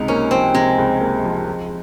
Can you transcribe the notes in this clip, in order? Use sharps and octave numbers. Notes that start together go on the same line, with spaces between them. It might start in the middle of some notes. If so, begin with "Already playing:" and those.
Already playing: C#2 C3 D#4
A#3 C#4
F3 C4
C3 G#3
C#2
A#3
F3
F3